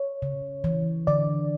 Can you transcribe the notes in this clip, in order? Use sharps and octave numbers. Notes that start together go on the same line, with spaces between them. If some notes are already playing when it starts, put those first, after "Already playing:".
Already playing: C#5
C#3
E3
D3 D5